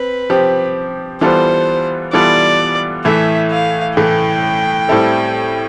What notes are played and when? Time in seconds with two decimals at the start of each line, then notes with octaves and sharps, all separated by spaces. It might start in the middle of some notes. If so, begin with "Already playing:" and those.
Already playing: C4 B4
0.30 F3 C4 G4
1.21 E3 G3 B3 F4 A4 C5
2.13 E3 G3 B3 F4 A4 D5
3.05 A2 E3 A3 E5
3.51 F5
3.97 A2 E3 A3 G5
4.89 A2 G3 C4 E4 A4